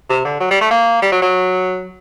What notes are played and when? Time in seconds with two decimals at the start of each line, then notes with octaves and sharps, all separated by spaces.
0.10 C3
0.25 D3
0.40 F#3
0.51 G3
0.61 A3
0.71 A#3
1.02 G3
1.12 F#3
1.22 F#3